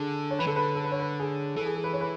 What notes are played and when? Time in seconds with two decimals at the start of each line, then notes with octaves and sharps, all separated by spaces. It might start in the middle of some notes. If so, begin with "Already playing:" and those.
Already playing: D3 G#4
0.31 C#5
0.39 E3 B4
0.47 D3 A4
0.56 B4
0.75 A4
0.84 B4
0.92 C#5
1.00 B4
1.20 G#4
1.56 E3 A4
1.65 G#4
1.75 A4
1.84 B4
1.93 C#5
2.01 B4